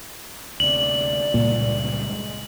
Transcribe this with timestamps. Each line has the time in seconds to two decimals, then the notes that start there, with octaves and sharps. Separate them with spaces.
0.60 D2 C3 D5 F#7
1.34 C#2 G2 A#2
2.03 G#3